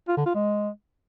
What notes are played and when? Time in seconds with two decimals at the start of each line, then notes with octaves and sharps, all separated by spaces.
0.08 F4
0.17 D3
0.26 F4
0.34 G#3